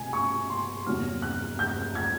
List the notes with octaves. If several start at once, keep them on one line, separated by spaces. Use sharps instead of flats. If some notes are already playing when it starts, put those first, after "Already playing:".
Already playing: B2 G#5
C#6
C6
E2 C3 D#3 F#3 A#3 F6
F#6
G6
G#6